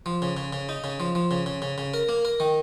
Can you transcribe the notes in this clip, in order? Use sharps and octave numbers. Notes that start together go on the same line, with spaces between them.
F3
C#3
C#3
C#3
D#4
C#3
F3
F3
C#3
C#3
C#3
C#3
A#4
A#3
A#4
D#3